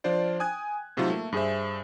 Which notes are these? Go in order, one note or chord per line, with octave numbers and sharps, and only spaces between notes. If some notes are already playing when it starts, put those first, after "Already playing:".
F3 D4 F4 C5 D5
G5 G#5 D#6 F#6 G#6
A2 C3 F#3 A3 D#4 F4
A3 A#3
G2 G#4 C5 E5